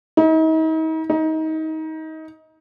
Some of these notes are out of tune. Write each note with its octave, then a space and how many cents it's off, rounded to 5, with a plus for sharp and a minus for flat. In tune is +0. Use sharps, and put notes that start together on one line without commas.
D#4 +40
D#4 +25